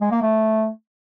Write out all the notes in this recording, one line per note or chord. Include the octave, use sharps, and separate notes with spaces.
G#3
A#3
A3